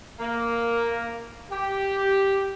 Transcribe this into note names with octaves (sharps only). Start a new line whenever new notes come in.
A#3
G4